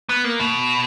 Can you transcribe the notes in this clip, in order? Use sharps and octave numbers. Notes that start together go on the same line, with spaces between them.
B3
A#3
B2